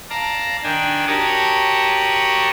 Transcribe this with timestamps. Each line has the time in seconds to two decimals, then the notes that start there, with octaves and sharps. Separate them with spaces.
0.10 D5 F5 A5 A#5
0.64 D#3 D4 G5 G#5
1.07 F#4 G4 A#4 C#5 A5 D#6